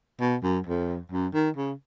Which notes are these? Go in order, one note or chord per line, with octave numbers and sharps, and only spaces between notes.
B2
F#2
F2
F#2
D#3
C#3